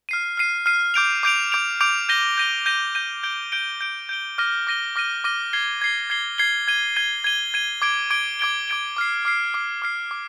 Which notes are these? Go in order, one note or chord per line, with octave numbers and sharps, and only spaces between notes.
F6 C7 D#7
F6 C7 D#7
F6 C7 D#7
D6 G6 D7 F7
D6 G6 D7 F7
D6 G6 D7 F7
D6 G6 D7 F7
G6 A#6 D#7 G7
G6 A#6 D#7 G7
G6 A#6 D#7 G7
G6 A#6 D#7 G7
G6 D7 G7
G6 D7 G7
G6 D7 G7
G6 D7 G7
D6 F6 A#6 D#7 G7
D6 F6 A#6 D#7 G7
D6 F6 A#6 D#7 G7
D6 F6 A#6 D#7 G7
G#6 C7 G7
G#6 C7 G7
G#6 C7 G7
G#6 C7 G7
G#6 D#7 G7
G#6 D#7 G7
G#6 D#7 G7
G#6 D#7 G7
D6 G#6 D7 G7
D6 G#6 D7 G7
D6 G#6 D7 G7
D6 G#6 D7 G7
D6 F6 C7
D6 F6 C7
D6 F6 C7
D6 F6 C7
D6